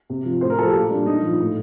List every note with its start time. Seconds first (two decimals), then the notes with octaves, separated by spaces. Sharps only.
0.10 C3
0.25 F3
0.41 A2 C5
0.50 A#4
0.58 F3 A4
0.66 G4
0.74 A#2 F4
0.90 G3 D4
1.06 A#2 D#4
1.22 F3
1.39 A2